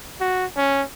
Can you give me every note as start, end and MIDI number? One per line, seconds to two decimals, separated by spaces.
0.20 0.45 66
0.57 0.82 61